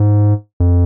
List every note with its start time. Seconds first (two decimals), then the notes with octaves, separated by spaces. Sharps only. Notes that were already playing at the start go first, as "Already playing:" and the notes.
Already playing: G#2
0.60 F2